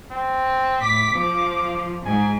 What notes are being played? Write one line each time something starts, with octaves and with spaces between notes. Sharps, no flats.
C4
A2 D6 B6
F3
G#2 G#5